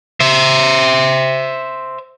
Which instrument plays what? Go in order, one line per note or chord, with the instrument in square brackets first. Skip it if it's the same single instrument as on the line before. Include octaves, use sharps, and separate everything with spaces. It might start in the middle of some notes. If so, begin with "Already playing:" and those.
[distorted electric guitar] C5 E5